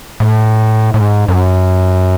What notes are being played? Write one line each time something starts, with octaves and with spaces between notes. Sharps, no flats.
A2
A2
G#2
F#2